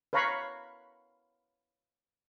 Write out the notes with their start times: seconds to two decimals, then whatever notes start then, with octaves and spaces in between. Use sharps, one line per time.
0.13 B4 C#5 F5 A#5 B5 C#6